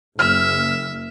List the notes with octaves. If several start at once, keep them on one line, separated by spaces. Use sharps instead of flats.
F#1 E5 F6